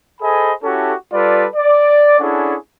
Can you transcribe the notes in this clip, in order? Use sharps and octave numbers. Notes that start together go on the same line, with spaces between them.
G#4 A4 C5 D#5 G#5 B5
C#4 E4 F#4 G4 A4
G3 F4 A4 B4 D5
D5
C#4 D4 E4 G#4 A4 F#5